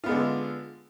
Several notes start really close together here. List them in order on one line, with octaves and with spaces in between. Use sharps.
F4 B3 G#3 D3